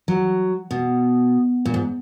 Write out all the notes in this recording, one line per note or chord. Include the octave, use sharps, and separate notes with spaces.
F#3
B2
A#2
G#2